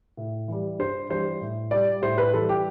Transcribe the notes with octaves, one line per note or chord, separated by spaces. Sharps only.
A2
E3 G3
G2 C5
E3 G3 C5
A2
G3 D5
A2 C5
B4
E3 G3 A4
G4